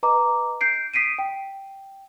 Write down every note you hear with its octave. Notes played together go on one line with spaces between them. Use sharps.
B4 D#5 A#5 D6
G6 C7 D7
D#6 B6 C7 D7 D#7
G5